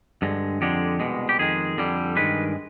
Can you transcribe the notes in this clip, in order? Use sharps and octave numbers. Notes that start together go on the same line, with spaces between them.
G2 D3 G#3
F2 D3 G#3 G4
C2 B2 G#3
G4
F2 D#3 G#3 G#4
F2 D3 G3
G2 D#3 G#3 B4